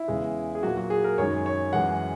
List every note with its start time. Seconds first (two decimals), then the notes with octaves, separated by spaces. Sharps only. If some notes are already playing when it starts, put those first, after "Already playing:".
Already playing: E4
0.08 E2 C#3 G#3
0.55 G#4
0.63 A#2 F#3 A#3 F#4
0.77 F#4
0.90 G#4
1.04 A#4
1.18 F#2 D#3 G#3 C#5
1.46 C#5
1.73 F#2 E3 G#3 F#5